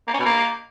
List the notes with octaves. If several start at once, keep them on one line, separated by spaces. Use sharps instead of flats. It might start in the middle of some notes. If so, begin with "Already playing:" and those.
A#3
C#4
B2
A#3